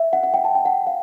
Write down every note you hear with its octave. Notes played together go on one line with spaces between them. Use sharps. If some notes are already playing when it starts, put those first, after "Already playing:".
Already playing: E5
F#5
F#5
G5
A5
G5
F#5
F5